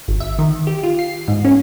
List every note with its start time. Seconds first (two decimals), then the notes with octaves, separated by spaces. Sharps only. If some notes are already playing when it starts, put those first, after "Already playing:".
0.08 G#1
0.20 E5
0.39 D#3
0.67 G4
0.83 F4
0.99 C7
1.28 G#2
1.45 C#4